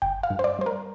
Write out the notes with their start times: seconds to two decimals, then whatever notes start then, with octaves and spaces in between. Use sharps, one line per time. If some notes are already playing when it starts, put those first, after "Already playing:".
0.02 G1 G5
0.23 F5
0.30 G2
0.39 C5
0.44 D5
0.59 G3 C5
0.66 A#4